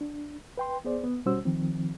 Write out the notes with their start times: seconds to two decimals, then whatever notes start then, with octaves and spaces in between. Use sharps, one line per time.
0.01 D4
0.58 B4 G5 C6
0.85 B3 G#4 C5 D5
1.04 B3
1.26 B2 G3 C#4 F#4 C5 E6
1.45 D#3 F3 C4